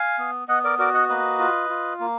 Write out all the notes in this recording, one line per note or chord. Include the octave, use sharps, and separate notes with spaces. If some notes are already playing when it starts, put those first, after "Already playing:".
Already playing: F5 G#5
B3
B3 D#5 F#5
A#4 D5
F#4 A#4 D5
D#5 F#5
A#3 B4 D#5
F4
F4
A#3